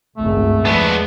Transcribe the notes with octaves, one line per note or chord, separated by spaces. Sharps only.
G#1 C#2 G2 A3
E2 F3 G#3 B3 D4